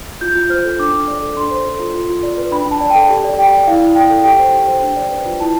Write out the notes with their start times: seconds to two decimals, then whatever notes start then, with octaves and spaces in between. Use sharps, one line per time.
0.21 F4 G6
0.35 F4
0.50 C5 F6
0.65 A4
0.79 D4 D6
0.94 D4
1.08 D5
1.22 A4
1.37 D4 C6
1.51 C5
1.66 A4
1.79 F4
1.94 F4
2.09 F4
2.23 D5
2.38 B4
2.51 D4 B5
2.66 D4
2.71 A5
2.81 D5
2.90 A4 G5
3.10 G4
3.24 D5
3.38 G4 G5
3.53 D5
3.67 E4 F5
3.81 E4
3.95 D5 G5
4.10 A4
4.24 G4 G5
4.39 C5
4.53 G4
4.68 C5
4.82 D4
4.96 D5
5.11 B4
5.26 F4
5.40 E4 A5